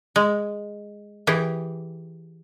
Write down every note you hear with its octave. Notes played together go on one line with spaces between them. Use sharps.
G#3
E3 G4 G#4